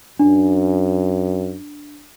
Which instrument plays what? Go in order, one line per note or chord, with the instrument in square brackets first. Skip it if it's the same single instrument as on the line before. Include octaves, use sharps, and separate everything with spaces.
[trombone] F#2 [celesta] D4